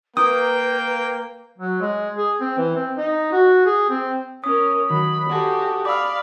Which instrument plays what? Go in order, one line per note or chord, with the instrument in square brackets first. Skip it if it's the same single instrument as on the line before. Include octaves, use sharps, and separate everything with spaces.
[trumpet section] A#3 [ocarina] B4 [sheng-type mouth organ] G5 [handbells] D#6
[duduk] F#3
G#3
G#4
C4
E3
C4
D#4
F#4
G#4
C4
[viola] C#4 A#4 [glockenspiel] D#6
[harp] D#3 [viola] F#3 B5
[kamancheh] F#4 A4 [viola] G4 [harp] D5 G#5 C6
[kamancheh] D5 F5 [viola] B5 [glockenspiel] D6 E6